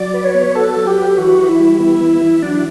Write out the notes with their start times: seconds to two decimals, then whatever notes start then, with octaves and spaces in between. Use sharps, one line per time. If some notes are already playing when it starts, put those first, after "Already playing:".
Already playing: F#3 D5
0.14 B4
0.24 C#5
0.35 B3
0.55 F#4 A4
0.76 F#3
0.87 G4
0.97 B4
1.18 E3 F#4
1.39 E3
1.49 E4
1.60 G3
1.80 B3
2.01 E3
2.21 E3
2.42 F#3 D4